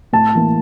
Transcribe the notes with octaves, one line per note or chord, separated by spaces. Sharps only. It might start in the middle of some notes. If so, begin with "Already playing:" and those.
A2 A5
E3 A#3